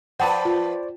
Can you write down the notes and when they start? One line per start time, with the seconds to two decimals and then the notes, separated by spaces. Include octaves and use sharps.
0.20 F3 B4 C5 D5 F#5 G5 A5 B5
0.45 F4